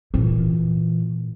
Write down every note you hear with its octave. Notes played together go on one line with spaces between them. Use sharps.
A#2 E3